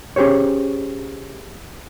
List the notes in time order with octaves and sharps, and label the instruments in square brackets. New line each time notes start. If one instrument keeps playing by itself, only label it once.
[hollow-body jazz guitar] C#4 G4 G#4 C5 C#5